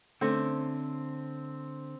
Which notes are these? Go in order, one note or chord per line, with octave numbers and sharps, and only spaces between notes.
D3 A3 C4 C#4